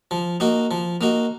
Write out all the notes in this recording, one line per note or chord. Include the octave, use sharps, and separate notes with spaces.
F3
A#3 D#4 F#4
F3
A#3 D#4 F#4